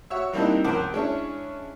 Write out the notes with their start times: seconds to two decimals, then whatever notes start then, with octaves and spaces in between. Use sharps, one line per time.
0.10 F#4 C#5 E5
0.32 E3 G3 A#3 C4 D4 D#4
0.64 C#2 F3 A#4 C5 F#5 D6
0.93 G#3 C#4 D4 E4